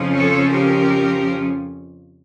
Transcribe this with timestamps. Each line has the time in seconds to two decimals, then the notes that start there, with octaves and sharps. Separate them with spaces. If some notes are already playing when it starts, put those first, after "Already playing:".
Already playing: F2 C#3 F3 C#4
0.15 A4 C#5
0.54 G4 A#4